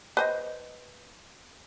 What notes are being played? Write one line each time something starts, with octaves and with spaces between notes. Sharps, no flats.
B4 C5 D#5